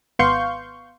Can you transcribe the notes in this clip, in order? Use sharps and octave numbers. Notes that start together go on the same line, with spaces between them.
G#1 B3 F5 C6 C#6 G6